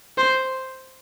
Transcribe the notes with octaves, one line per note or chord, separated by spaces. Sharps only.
C5